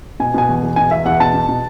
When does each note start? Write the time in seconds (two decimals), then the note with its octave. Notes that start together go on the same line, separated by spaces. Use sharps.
0.20 B2 G#5
0.34 B2 G#5
0.49 E2
0.63 E2
0.76 B2 G#5
0.91 E2 E5
1.05 E2 F#5
1.20 B2 A5
1.34 B2
1.49 B2